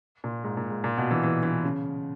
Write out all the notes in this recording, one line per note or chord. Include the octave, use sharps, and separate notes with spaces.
A#2
G#2
A#2
G#2
A#2
B2
E3
E3
E3
C#3